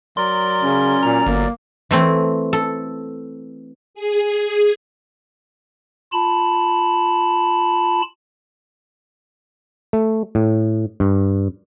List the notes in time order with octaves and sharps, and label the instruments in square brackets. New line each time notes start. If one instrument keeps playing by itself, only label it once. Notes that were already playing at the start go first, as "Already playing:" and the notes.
[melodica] F#3 A#4 D5 [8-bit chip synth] C6
[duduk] C#3 [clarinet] C#4
[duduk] A#2 [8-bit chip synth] A#5
[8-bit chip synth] G1 [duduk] A#3
[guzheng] E3 A3 C4
A4
[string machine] G#4
[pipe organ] F4 A5 B5
[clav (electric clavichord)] A3
A2
G2